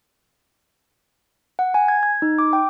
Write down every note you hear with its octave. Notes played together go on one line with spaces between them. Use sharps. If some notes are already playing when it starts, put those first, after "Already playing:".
F#5
G#5
G#6
G#6
D#4
D6
G5